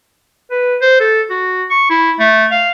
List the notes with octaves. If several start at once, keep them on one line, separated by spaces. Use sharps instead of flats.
B4
C5
A4
F#4
C#6
E4
A3
F5